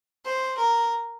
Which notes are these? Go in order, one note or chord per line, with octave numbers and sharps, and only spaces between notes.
C5
A#4